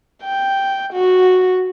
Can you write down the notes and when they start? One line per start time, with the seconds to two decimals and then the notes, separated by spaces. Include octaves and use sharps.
0.23 G5
0.93 F#4